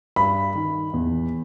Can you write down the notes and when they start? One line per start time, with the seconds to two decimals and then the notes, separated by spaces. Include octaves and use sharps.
0.16 G2 B5
0.55 D#3
0.94 E2